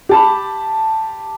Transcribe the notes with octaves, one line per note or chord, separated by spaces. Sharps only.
G4 A5 B5